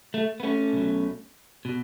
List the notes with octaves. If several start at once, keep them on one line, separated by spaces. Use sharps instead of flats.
A3
B3
A3 C#4
B1 B2
B2